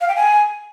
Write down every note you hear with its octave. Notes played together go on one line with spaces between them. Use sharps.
F5
G5
G#5